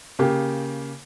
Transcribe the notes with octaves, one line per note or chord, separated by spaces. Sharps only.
C#3 A#3 G4